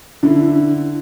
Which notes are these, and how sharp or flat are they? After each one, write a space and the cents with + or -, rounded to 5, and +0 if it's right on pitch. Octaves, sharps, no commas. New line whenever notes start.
D3 +0 E4 +0